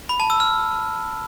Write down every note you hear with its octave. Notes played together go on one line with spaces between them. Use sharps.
B5
A5
E6
F6